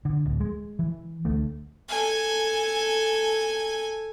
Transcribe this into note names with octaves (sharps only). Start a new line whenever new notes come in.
D3
D1
G#3
E3
D2 A3
A4 G#5